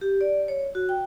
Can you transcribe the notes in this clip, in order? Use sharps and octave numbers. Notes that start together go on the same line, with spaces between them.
G4
D5
C#5
F#4
G5